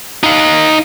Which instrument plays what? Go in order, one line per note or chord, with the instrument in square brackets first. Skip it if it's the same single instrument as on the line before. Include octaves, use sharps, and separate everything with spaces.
[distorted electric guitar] D#4 F5